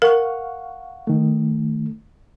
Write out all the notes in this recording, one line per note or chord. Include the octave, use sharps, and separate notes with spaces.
A#4 F5 F#5 C#6
D#3 A3